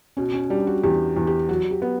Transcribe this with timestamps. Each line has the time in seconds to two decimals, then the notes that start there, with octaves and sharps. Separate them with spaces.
0.17 B2 C#4
0.33 C#4
0.50 G3 D4
0.67 F#4
0.83 E2 G4
1.17 E2
1.27 G4
1.49 F#3 F#4
1.71 G4
1.82 B3